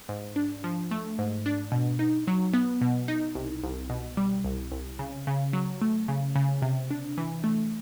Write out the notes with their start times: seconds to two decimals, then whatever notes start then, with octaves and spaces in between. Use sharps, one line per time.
0.09 G#2
0.36 D4
0.64 F3
0.91 A3
1.19 G#2
1.46 D4
1.72 B2
1.99 D#4
2.28 F#3
2.54 B3
2.81 B2
3.08 D#4
3.35 C2
3.63 C2
3.90 B2
4.17 G3
4.45 C2
4.72 C2
4.99 C#3
5.27 C#3
5.53 F#3
5.82 A3
6.08 C#3
6.35 C#3
6.62 C3
6.90 D4
7.18 E3
7.44 A3